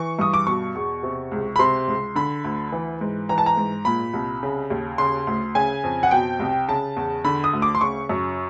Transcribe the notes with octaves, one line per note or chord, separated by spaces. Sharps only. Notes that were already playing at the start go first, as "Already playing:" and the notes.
Already playing: E3 C#6
G2 D#6
D6
B2 C#6
E2
C3
C#2
B5
C3 C6
C#2
D3 B5
D2
E3
G#2
E3 A#5
A5
A#5
G#2
A#2 B5
C2
C#3
D#2
C#3 C6
D2
C#3 G#5
F2
F#5
B2 G5
C2
C#3 A5
E2
D3 B5
D#6
D2
D6
C6
C#3 C#6
F#2